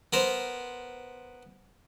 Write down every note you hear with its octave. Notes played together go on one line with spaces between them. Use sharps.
B3 A#4 C5